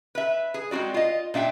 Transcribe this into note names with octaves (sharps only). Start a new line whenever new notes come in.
B4 E5
G#4
G#3 C4 F4 F#4 D5
F4 D#5
A#2 D4 E5 G5